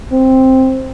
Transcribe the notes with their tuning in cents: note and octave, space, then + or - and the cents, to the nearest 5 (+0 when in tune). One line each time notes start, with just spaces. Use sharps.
C4 +5